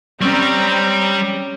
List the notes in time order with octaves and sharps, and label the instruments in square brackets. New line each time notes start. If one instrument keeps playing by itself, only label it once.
[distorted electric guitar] G3 [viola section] C4 A#5 [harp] C#4